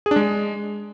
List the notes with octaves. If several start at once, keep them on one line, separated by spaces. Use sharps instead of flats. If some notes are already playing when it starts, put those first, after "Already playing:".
G#4
D4
G#3